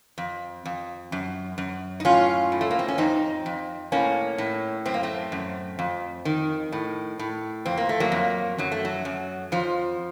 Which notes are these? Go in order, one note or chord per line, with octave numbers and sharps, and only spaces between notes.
F2
F2
F#2
F#2
D#4
A2 C#4 F4
A2
A3
A#3
C4
C#4
F2 C4 D#4
F2
A2 A#3 C#4
A2
F#2 C4
A#3
A3 C4
F#2
F2
D#3
A2
A2
F2 C4
A#3
A3
F#3 A#3
F2
F#2 F#3
A3
F#3
F#2
F2 F3